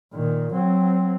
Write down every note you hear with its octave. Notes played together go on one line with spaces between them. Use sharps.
A#2 D#3
F#3 C4